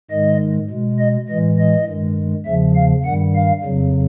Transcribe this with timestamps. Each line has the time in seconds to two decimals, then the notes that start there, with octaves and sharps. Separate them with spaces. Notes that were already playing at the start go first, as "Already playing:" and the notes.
0.10 G#2 D#3 G#3 D#5
0.69 B2 G#3
0.99 D#5
1.28 A2 E3 G#3 D#5
1.58 D#5
1.87 G2 D#3 G#3
2.46 E2 C#3 F3 E5
2.75 F5
3.05 G2 D#3 G3 F#5
3.35 F5
3.64 F2 C#3 F#3